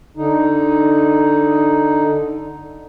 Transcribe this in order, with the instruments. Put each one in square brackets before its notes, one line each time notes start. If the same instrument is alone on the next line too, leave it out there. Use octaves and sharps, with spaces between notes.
[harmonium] D3 D#4